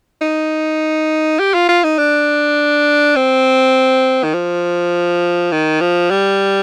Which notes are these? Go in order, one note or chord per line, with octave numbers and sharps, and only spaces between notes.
D#4
G4
F4
F4
D#4
D4
C4
D#3
F3
D#3
F3
G3